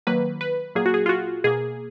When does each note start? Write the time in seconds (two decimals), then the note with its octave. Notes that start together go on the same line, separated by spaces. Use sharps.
0.07 D#3 F#3 A#3 B4
0.41 B4
0.75 A#2 F#3 A#3 G#4
0.86 F#4
0.94 G#4
1.06 F4
1.09 F#4
1.44 B2 A#3 G#4